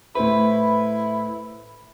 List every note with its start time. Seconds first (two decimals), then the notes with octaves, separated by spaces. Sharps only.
0.15 A2 E4 B4 C5